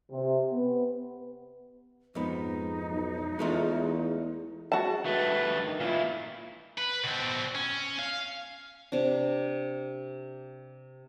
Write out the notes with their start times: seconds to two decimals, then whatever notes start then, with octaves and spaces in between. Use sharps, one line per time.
0.11 C3
0.50 B3
2.15 F2 G#2 B3 D#4
2.89 B1
3.39 E2 G#3 A3 F4
4.72 G#3 F#4 A5
5.05 G2 A3 B4
5.65 D#3
5.80 A#2 E4 F4
6.78 B4
7.04 B2 C4
7.55 C#4
7.99 F5
8.92 C3 D4